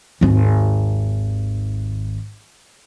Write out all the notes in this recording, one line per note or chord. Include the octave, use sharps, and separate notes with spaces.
G#1 D#2